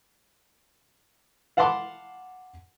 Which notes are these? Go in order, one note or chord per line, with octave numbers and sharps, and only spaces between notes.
F5 F#5 A5 B5 C6 D6